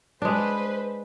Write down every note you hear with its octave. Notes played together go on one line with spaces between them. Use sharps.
G#3 D4 B4 C5